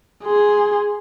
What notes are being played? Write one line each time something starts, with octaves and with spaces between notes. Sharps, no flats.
G#4 C6